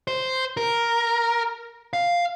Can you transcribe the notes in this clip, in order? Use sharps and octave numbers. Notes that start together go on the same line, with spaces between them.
C5
A#4
F5